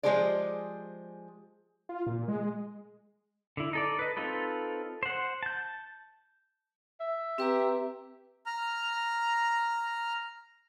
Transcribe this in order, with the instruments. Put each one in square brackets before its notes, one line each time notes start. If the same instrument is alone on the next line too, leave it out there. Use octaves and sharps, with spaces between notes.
[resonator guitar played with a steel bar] F3 G#3 G4 G#4 C5 D5
[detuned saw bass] F4
A#2
G#3
[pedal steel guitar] D3 E4
D#4 A4 D5
B4 D#5
C4 D#4 F4 A4 B4
C5 F#5
A5 G6
[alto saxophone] E5
[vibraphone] C4 B4 A#5 [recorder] G4
[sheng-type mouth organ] A#5 F6